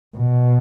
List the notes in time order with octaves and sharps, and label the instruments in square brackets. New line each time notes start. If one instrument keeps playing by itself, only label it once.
[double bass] B2